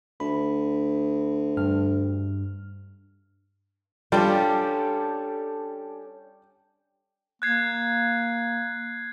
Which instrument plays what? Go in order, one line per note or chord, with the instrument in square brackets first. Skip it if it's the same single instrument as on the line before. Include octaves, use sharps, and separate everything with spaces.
[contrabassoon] D2 [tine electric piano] B5
[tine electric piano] G2 F6
[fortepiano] G3 F4 [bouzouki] C#4 A4 [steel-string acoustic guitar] D4 G4 [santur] G5
[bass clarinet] A#3 [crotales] F#6 G#6 C7